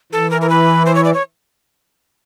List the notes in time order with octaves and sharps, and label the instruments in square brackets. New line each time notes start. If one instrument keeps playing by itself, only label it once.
[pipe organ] E3 [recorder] A4
[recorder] A#4
A#4
B4
C5
C#5
D5
C#5